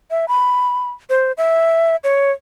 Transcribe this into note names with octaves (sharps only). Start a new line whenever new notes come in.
E5
B5
C5
E5
C#5